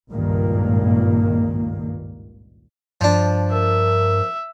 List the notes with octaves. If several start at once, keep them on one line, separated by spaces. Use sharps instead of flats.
G#1 C#2 G2 A#2 D#3 A#3
G2 F3 D4
A#4 E5